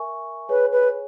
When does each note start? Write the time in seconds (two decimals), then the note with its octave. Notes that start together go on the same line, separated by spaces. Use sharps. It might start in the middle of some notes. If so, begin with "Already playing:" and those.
Already playing: A#4 E5 G#5 C#6
0.48 G#4 B4 C#5 G#5
0.72 B4